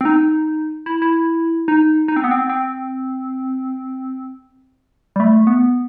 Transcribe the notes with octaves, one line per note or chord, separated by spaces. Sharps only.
C4
D#4
E4
E4
D#4
D#4
C4
B3
C4
C4
G3
A3
B3